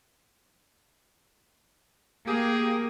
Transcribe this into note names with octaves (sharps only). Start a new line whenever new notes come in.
A#3 G4 G#4